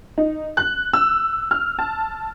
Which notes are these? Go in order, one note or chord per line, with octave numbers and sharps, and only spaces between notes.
D#4
F#6
E6
F6
A5